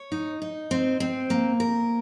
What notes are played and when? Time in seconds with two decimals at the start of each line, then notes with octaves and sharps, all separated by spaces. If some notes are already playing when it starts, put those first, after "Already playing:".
Already playing: C#5
0.12 D#4
0.42 D#4
0.71 C4
1.00 C4
1.30 A#3
1.60 A#4